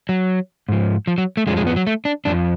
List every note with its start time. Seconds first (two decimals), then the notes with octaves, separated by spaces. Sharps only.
0.09 F#3
0.69 G#2 F3
1.07 F3
1.18 F#3
1.37 A3
1.47 F2 F3 G#3
1.57 G#3
1.67 B3
1.76 F#3
1.87 A3
2.05 D4
2.25 F2 D3 F3 D4